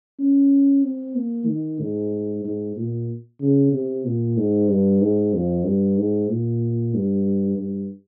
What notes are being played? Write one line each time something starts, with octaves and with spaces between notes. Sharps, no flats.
C#4
C4
A#3
D#3
G#2
G#2
A#2
C#3
C3
A#2
G#2
G2
G#2
F2
G2
G#2
A#2
G2
G2